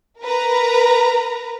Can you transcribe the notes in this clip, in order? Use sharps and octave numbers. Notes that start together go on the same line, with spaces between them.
A#4 B4 A#5